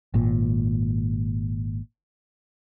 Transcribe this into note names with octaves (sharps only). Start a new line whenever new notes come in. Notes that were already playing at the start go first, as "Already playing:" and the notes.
G#1 A#2